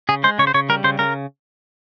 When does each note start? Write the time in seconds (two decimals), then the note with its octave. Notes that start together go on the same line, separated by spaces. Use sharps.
0.09 C#3 G#4
0.24 G#3 C5
0.38 C#3 C#5
0.47 C5
0.54 C#3 C#5
0.69 G3 A#4
0.84 C#3 C5
0.99 C#3 A#4